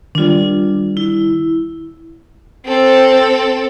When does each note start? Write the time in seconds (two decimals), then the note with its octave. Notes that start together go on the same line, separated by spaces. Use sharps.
0.15 D#3 G3 D4 F4
0.97 E4
2.65 C4 A4